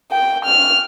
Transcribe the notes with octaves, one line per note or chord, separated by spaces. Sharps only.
G5
F6